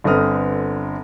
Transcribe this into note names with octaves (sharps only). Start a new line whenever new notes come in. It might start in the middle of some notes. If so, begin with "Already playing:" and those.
G1 D3 C4 B4 D#6 F6